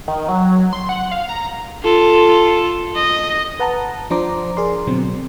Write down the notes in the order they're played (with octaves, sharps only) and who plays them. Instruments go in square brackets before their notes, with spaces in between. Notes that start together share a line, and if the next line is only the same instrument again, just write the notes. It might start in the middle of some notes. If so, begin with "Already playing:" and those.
[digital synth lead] D#3
F#3
C6
F#5
F5
A#5
[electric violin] F4 A4
D#5
[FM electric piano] B4 F#5 A5 A#5
F3 D4 C5 A#5 D6
G#4 A#4 D5 C6
B2 D3 F#3 C4